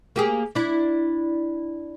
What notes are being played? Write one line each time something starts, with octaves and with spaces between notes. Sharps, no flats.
A#3 G4 G#4
D4 E4